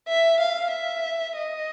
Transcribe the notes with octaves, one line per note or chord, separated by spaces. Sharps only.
E5
F5
E5
D#5